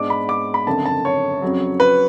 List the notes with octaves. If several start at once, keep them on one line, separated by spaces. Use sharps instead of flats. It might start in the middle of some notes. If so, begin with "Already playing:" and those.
Already playing: G#2 G#3 B3 D4 D6
B5
D6
B5
F#1 F2 D3 A5
A5
C#5
F2 C#3 F#3
B4